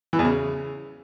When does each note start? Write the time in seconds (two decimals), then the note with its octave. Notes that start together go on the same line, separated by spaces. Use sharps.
0.13 E3
0.19 E2
0.25 C#3